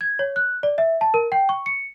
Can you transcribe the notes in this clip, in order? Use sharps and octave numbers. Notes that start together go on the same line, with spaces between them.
G#6
C#5
F#6
D5
E5
A5
A#4
G5
C#6
C#7